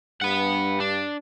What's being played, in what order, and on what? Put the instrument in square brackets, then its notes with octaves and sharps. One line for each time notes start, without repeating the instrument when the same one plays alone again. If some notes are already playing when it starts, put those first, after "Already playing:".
[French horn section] G2 [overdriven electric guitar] B4 F#5
[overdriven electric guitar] D4